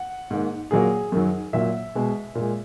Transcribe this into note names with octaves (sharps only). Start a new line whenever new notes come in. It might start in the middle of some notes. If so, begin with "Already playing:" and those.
Already playing: F#5
G#2 D#3 A#3
A#2 F#3 A#3 G#4
F#2 D#3 F#3
A#2 F#3 A#3 E5
B2 G#3
A#2 G#3